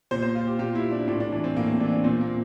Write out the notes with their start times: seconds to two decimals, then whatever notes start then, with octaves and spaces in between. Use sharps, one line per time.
0.11 A#2 C5
0.22 C5
0.35 F4
0.47 G4
0.59 A#2 G4
0.75 E4
0.91 D4
1.08 A2 D4
1.20 D4
1.32 E3 D4
1.44 C4
1.56 A2 A#3
1.68 C4
1.80 E3 D4
1.92 D4
2.04 A#2 C4
2.21 A#3